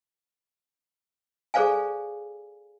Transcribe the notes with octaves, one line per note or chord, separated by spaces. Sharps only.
G#4 A4 C5 D5 F5 G#5